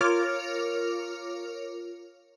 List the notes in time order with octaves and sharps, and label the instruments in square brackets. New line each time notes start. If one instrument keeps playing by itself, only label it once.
[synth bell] F4 A#4 C#5 D6 F6 F7